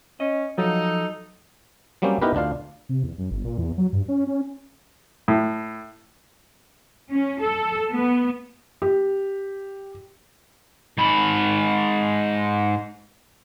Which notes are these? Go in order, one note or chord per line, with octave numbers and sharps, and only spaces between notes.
C#4 D#5
F3 F#3 D#4 A4
F#3 G3 A#3 C4 C#4 G4
B3 D#4 E4 G4 A#4 B4
D2 D4 F4 F5
C3
E2
F#2
G1
A#2
E2
F#3
G2
C#4
C#4
A2
C#4
A4
B3
G4
G#2 B5